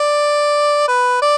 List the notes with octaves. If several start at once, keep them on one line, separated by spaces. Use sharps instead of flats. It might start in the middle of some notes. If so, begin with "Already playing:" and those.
Already playing: D5
B4
D5